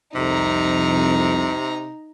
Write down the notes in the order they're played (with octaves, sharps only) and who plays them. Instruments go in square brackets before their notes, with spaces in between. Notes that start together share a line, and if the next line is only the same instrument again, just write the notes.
[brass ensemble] C2 F2 [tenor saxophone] C3 [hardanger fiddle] D#4 A#5